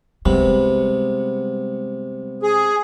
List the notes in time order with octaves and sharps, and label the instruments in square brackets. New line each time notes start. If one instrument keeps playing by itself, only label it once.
[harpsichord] C3 [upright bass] G3 [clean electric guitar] G#3 B3 B4
[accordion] G#4